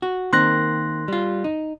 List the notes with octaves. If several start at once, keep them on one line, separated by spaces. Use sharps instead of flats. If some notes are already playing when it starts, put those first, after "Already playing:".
F#4
D#3 A#3 C4 C6 F#6 A#6
G3 F4
D#4